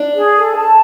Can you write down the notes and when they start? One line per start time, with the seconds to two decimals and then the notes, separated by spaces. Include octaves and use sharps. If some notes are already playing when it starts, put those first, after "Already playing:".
Already playing: D4
0.14 G#4
0.35 A4
0.56 A5